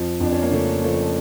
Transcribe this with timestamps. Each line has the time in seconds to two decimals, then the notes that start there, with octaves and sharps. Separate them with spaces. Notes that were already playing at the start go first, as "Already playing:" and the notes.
Already playing: F2 F3
0.20 F2 D4
0.32 C#4
0.42 A#3
0.51 C#3 A3
0.83 F3 A3